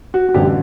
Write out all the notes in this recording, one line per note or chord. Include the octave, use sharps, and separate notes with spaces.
F#4
F#4
A1 G2 D3 G4
F#4